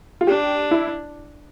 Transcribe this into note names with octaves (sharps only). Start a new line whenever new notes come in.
F4
D4 G4
E4